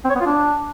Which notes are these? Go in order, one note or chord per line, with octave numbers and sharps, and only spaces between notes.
C4
C#5
B3
F4
D4